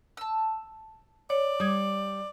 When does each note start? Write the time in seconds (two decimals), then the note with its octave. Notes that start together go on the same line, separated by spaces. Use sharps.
0.17 A5 E6
1.30 C#5 D5
1.60 G3 D6 D#6 G#6